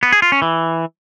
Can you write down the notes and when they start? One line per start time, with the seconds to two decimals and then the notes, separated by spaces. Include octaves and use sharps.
0.03 B3
0.12 G#4
0.22 F4
0.32 C#4
0.42 E3